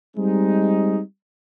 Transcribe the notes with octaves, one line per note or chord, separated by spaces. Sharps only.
G3 G#3 C4 D#4